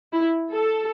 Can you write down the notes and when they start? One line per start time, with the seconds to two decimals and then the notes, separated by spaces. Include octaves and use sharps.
0.13 E4
0.51 A4